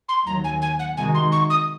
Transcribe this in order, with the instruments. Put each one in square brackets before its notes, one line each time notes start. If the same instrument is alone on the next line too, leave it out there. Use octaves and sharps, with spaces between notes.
[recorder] C6
[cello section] D#2 D#3 F#3 [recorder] A#5
[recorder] G#5
G#5
F#5
[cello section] C3 D#3 G#3 D#4 F#4 [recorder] G#5
[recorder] C6
C#6
D#6